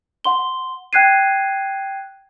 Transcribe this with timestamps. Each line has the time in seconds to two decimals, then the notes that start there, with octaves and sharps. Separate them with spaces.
0.24 F#5 C6 G7
0.93 G5 F#6 G#6 C7 D#7